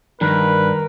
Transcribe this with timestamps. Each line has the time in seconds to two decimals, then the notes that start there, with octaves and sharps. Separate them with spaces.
0.21 G2 D#3 A#4 B4